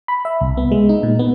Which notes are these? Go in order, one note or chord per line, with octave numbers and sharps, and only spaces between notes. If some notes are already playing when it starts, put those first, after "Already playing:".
B5
E5
C2
B3
G#3
D#4
A#2
B3